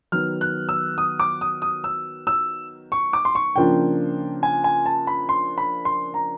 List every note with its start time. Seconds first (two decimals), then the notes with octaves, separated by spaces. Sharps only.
0.12 D#3 F#3 B3 F6
0.41 F#6
0.69 E6
0.98 D#6
1.19 D6
1.41 D#6
1.62 D#6
1.84 E6
2.27 E6
2.92 C#6
3.13 D6
3.25 C6
3.35 C#6
3.56 C#3 F3 A#3 D4 F4 G5
4.43 G#5
4.64 G#5
4.86 A5
5.07 B5
5.29 C6
5.58 B5
5.85 C6
6.14 A#5